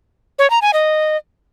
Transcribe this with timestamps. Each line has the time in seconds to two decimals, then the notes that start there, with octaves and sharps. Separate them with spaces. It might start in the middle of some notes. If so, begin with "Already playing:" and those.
0.39 C#5
0.50 A#5
0.62 G#5
0.74 D#5